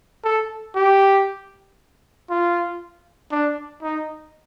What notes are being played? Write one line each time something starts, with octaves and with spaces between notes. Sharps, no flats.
A4
G4
F4
D4
D#4